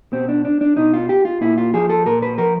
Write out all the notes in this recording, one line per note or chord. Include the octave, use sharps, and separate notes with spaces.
B2 C4
D4
D4
D4
B2 D#4
F4
G4
F4
A#2 E4
F4
F3 G#4
A4
A#2 A#4
B4
F3 A#4